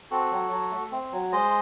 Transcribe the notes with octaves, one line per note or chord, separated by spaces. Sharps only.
C4 F#4 A4
F#3
F#3
A3
C4
F#3
G#3 C5 D#5